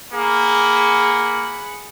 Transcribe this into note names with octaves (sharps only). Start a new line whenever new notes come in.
A#3 G#4 F#5 B5